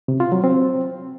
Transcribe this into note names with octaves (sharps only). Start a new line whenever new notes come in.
C3
F4
F#3
C4